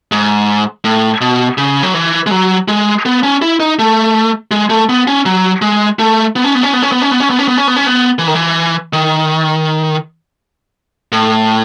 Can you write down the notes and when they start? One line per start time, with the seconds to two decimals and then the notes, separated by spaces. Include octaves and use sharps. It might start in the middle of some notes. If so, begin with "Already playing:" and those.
0.12 G#2
0.84 A2
1.21 B2
1.58 C#3
1.83 F#3
1.94 E3
2.26 G#3
2.31 F#3
2.68 G#3
3.05 B3
3.23 C#4
3.42 E4
3.60 D#4
3.79 A3
4.51 G#3
4.70 A3
4.89 B3
5.07 C#4
5.26 F#3
5.62 G#3
5.99 A3
6.36 B3
6.44 C#4
6.55 B3
6.63 C#4
6.73 B3
6.83 C#4
6.92 B3
7.02 C#4
7.11 B3
7.20 C#4
7.30 B3
7.39 C#4
7.48 B3
7.57 C#4
7.68 B3
7.76 C#4
7.87 B3
8.19 E3
8.27 D#3
8.34 E3
8.93 D#3
11.12 A2